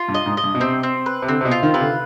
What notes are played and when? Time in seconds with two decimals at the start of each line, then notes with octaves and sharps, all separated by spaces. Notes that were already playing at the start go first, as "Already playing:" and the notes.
Already playing: F4
0.08 G2
0.14 D#5
0.26 G#2
0.37 D#5
0.44 G2
0.55 B2
0.60 C3 C4
0.83 C4
1.06 B4
1.22 C3
1.28 D3 C4
1.41 C3
1.45 B2
1.51 F4
1.63 D#3
1.74 C3 B4
1.81 D3